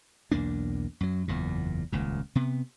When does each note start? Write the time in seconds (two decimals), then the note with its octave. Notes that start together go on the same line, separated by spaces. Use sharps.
0.31 B1 E2 A#3 D4
1.01 F#2 F#3
1.28 F#1 E2 A#2
1.92 D#1 C#2 A#2
2.35 C3 B3